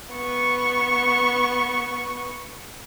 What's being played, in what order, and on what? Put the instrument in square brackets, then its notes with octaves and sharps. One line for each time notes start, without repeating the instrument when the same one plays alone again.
[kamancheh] B3 C#6